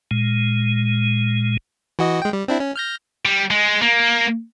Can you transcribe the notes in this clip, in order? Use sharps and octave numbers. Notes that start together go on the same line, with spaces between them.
A#2 G#3
E3 F#4 D#5
G#3 G5
G3
C4 D4 E4
C#4
F6 G6 A#6
G3
G#3
A#3